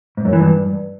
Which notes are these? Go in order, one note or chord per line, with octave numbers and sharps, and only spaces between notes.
G#2
F#2
E3
G2